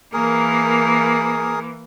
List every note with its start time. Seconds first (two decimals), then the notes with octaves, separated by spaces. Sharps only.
0.13 E3 A#3 G#4 A#4